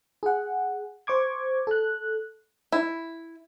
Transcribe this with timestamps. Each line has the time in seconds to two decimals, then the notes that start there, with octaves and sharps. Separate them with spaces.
0.23 G#4 F#5
1.07 C5 C#6 D6 G#6
1.67 A4 F#6
2.72 E4